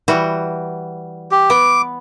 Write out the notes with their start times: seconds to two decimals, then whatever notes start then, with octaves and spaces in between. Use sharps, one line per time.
0.08 E3 G3 F#4
1.32 G4
1.50 B3 D6